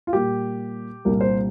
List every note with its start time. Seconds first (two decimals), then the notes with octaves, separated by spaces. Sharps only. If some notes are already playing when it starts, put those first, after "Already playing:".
0.07 F4
0.13 A#2 G3 A#3 G4
1.05 C2 A#2 G3 A#4
1.21 C5